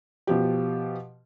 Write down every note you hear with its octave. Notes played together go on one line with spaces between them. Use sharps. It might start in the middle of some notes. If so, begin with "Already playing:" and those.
B2 F3 G4